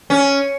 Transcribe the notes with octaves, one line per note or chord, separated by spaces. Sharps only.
C#4